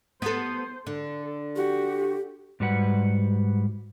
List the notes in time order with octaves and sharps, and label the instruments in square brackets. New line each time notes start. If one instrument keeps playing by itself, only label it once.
[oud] B3 A4 [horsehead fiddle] C5
[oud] D3 [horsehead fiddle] A4
[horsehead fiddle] F#4 [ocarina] G4
[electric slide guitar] G#2 G3 F#4 B4 F#5